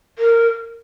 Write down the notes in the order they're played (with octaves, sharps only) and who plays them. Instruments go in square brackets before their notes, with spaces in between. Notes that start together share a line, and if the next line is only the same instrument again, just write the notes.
[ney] A#4